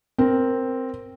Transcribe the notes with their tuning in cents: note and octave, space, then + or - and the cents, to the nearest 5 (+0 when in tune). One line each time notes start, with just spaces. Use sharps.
C4 +0 A#4 +0